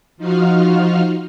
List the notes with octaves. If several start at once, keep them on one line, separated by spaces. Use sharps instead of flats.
F3 D#4 F4 F#4 F6